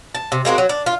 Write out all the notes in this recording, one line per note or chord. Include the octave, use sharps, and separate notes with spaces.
A5
C3
G#3 A#3 C4 F#4
F#3
D4
F4